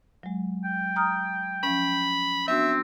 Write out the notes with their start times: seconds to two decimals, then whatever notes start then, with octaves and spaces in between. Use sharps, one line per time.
0.23 F#3 G#3
0.64 G5
0.96 A#5 D#6 F6
1.63 F3 C#4 B5
2.48 B3 C4 D4 F#4 E5